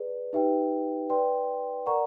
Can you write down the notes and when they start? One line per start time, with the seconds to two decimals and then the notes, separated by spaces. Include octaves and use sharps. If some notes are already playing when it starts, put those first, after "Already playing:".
Already playing: G#4 B4 D5
0.33 D#4 G4 B4 E5 G5
1.10 B4 D5 G5 C6
1.86 A#4 D5 F#5 A#5 C#6